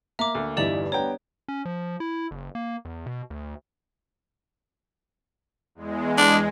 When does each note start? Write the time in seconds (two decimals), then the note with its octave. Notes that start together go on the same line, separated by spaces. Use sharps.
0.19 A#3 E5 A#5 D6
0.35 D2
0.57 G1 E2 G2 D#4 E4 G4 D5 F#7
0.92 G3 B3 D4 C#5 G5 A#5
1.48 C#4
1.65 F3
2.00 E4
2.31 F#1
2.55 A#3
2.85 E2
3.06 B2
3.30 D2
5.75 E2 G#3
6.18 G#3 D4